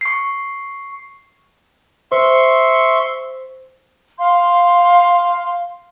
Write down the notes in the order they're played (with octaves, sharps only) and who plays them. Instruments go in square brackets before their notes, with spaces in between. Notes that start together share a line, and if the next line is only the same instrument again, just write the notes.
[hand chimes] C#6 C7
[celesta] C5 [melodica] E5 C6 C#6
[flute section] F5 C6